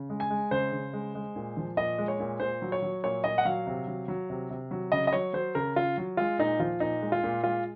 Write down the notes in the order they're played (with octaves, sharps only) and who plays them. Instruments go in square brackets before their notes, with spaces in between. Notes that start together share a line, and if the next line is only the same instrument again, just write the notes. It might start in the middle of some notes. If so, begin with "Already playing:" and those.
Already playing: [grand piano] C#3
G#3
G#5
G#3
C#3 C5
C#3
G#3
G#3
A#2
F3
A#2 D#5
G#3
C#5
A#2
A#2 C5
F#3
C#5
F#3
A#2 C#5
A#2 D#5
F#5
F#3 F5
C3
F#3
F#3
C3
C3
F#3
C#3 D#5
D#5
F#3 C#5
F#3 C5
C#3 A#4
C#3 F4
F#3
G#3 F4
A#2 D#4
F3 F4
A#2 D#4
G#3
F4
A#2
G#3 F4